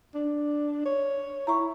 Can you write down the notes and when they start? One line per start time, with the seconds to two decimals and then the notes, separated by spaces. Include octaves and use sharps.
0.14 D4
0.85 C#5
1.47 E4 A#5 C#6